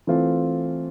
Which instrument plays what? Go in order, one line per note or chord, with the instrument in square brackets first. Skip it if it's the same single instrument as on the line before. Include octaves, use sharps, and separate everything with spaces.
[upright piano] E3 A3 C4 F4